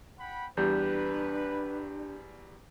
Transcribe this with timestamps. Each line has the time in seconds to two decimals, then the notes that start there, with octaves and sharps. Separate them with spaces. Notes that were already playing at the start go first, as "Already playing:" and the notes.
0.19 F#5 G5 B5
0.57 E2 G3 D4 G4 B4 G6